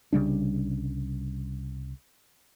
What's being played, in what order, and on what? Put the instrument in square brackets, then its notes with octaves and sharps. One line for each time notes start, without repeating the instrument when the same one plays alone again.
[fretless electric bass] C2 C#3 G3 D4